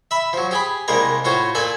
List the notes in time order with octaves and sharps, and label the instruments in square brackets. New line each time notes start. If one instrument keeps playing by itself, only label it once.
[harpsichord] E5 B5
F3 F#3
G4 G#4 B5
C2 G3 G#3 A#3 A#4 A#5
A2 F4 F#4 C5 C#5
A#2 A4 D5 G#5